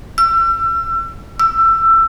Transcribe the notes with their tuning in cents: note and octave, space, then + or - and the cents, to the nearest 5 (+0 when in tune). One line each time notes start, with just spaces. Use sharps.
E6 +35
E6 +20